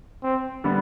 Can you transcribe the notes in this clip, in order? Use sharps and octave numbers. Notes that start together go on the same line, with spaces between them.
C4
D3 G3 B3 D4